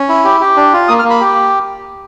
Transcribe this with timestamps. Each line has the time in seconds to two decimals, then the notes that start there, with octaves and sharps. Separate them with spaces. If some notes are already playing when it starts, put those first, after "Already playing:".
Already playing: C#4
0.09 E4
0.24 G4
0.40 G4
0.57 D4
0.73 F4
0.88 A#3 D#6
0.99 F6
1.05 A#3
1.10 B5
1.20 G4